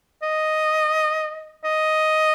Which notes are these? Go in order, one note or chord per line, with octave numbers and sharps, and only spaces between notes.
D#5
D#5